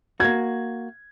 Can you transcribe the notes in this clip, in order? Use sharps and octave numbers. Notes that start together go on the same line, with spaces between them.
A#3 F#4 G#6